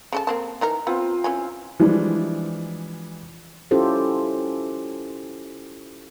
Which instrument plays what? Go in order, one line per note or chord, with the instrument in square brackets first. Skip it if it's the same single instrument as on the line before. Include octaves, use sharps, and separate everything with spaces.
[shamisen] C#3 A4 A5
A#3 C4 A5
E3 D#4 A#4
[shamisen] B3 [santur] C4 F4
[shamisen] E3 C#4 G#5
[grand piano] E3 F3 G3 G#3 D4
[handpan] C#4 E4 F4 G4 A4 C5